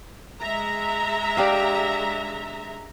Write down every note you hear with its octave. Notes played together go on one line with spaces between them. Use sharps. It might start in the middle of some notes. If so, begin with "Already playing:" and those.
G#3 E5 A#5
D4 G4 F5